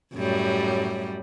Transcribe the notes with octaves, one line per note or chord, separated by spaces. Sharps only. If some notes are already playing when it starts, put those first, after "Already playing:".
F#2 A2 G3